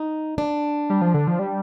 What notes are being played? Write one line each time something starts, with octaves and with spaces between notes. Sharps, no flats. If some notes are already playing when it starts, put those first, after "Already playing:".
Already playing: D#4
D4
G3
F3
D3
F3
G3